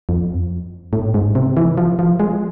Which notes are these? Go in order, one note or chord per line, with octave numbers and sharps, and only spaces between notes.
F2
A2
G#2
C3
E3
F3
F3
G#3